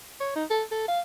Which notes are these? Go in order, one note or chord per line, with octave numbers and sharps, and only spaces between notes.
C#5
D#4
A4
A4
F5